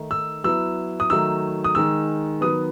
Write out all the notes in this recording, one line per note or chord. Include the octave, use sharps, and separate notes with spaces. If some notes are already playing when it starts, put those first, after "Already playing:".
Already playing: D#3 A3 D#4
E6
F#3 B3 E4 E6
D#6
D#3 F#3 A3 D#4 E6
D#6
D#3 G#3 D#4 E6
D#3 F#3 B3 D#6